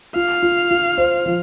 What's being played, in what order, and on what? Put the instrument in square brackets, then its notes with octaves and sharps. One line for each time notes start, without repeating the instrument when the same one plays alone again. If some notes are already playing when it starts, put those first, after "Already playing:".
[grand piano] F4 [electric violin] F5
[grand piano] F4
F4
C5
F3